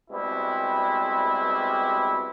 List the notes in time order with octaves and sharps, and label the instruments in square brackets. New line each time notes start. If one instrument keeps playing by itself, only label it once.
[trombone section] B2 G3 G#3 C4 E4 B4